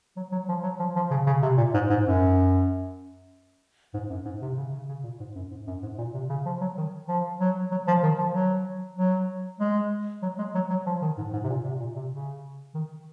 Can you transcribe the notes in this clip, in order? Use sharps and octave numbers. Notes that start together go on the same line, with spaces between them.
F#3
F#3
F3
F#3
F3
F3
C#3
C#3
C3
A#2
G#2
G#2
F#2
G#2
F#2
G#2
C3
C#3
C#3
C#3
A#2
G#2
F#2
G#2
F#2
G#2
A#2
C3
C#3
F3
F#3
D#3
F3
F#3
F#3
F3
D#3
F3
F#3
F#3
G#3
F#3
G#3
F#3
F#3
F3
D#3
G#2
G#2
C3
A#2
C3
A#2
C3
C#3
D#3